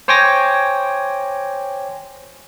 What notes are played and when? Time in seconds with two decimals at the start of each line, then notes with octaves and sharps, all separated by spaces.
0.08 C5 C#5 G5 G#5 D6 A#6